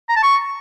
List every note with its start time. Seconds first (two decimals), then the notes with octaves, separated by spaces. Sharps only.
0.09 A#5
0.16 A5
0.23 C#6